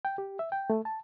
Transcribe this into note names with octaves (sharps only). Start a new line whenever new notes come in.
G5
G4
E5
G5
A3
A5